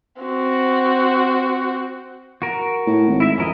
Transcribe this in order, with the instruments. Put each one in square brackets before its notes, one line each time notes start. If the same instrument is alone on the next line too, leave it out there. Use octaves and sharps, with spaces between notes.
[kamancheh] C4 F#4
[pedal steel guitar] F#4 A#4
[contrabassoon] A2
G#1
[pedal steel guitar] E4 E5
[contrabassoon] F2 [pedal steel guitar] C#4 A#4 D#5